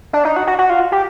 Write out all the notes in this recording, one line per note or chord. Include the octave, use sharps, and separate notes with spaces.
D4
D#4
F#4
F#4
F#4
F4
G4